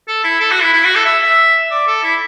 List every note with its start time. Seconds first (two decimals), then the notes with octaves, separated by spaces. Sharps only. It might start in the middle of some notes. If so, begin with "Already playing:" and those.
0.08 A4
0.24 E4
0.40 A4
0.51 F#4
0.62 E4
0.73 E4
0.85 F#4
0.95 A4
1.05 E5
1.23 E5
1.71 D5
1.87 A4
2.03 E4